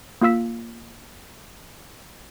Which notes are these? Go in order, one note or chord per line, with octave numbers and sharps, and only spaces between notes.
A#3 F4 F5 E6 B6